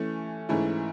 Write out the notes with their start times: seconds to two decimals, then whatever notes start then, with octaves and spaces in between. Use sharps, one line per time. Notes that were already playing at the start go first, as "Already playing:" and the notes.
Already playing: E3 A3 C#4
0.49 G#2 E3 A3 C#4 E4